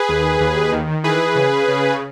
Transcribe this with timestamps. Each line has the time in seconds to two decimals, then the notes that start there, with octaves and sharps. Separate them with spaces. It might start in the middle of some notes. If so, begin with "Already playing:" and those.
Already playing: G#4 B4
0.09 D#2
0.40 D#2
0.72 D#3
1.04 E3 G#4 B4
1.36 C#3
1.68 C#3